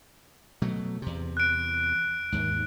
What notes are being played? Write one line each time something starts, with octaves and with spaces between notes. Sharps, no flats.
B2 F#3 A3
E2 C3
F#6 D7
D#2 G#2